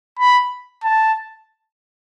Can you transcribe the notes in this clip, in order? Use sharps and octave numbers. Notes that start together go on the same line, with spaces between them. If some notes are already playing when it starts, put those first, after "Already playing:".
B5
A5